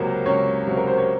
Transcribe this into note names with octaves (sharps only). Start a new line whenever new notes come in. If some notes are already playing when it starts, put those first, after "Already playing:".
Already playing: C#2 C3 F#3 A#3 A#4
C#2 C#4 C#5
C3 F#3
A#4
C5
C#5